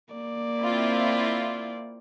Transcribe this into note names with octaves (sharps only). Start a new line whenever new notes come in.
A#3 D5
C4 E4 F4